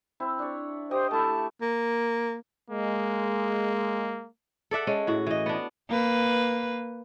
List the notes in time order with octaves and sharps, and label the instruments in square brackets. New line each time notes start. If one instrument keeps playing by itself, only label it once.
[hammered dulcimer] C4 E4
D4 C#5
[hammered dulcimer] G4 D#5 G5 [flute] C5
[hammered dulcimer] A3 E4 [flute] A5
[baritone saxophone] A#3
[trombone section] G#3 [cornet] A#3
[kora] A4 D5 E5 F#5
G#3 C#4
A2 F#4
E3 D#5
B3 D4
[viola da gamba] A#3 B4